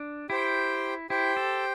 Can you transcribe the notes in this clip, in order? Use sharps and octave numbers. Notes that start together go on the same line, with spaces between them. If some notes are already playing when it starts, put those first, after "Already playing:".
Already playing: D4
E4 G4 C5 G5
E4 G4 C5 G5
A4